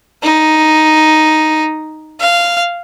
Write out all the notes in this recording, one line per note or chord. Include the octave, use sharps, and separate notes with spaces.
D#4
F5